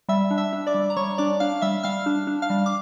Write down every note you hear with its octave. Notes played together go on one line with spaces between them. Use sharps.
G3 E5 E6
D4
E5 E6
D4
D5 D6
G3
A#5
G3 C#5 C#6
D4 D5 D6
D4 F5 F6
G3 E5 E6
G3 F5 F6
D4
D4
F5 F6
G3
D6